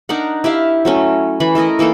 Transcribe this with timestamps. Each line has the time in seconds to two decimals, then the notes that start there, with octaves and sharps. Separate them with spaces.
0.09 D4 D#4 A#4 F#5
0.44 E4 G4 E5 F5
0.85 F#3 A3 C#4
1.40 E3 B5
1.55 A3 E4 A#4 D#5
1.79 E3 A#3 D#4 A4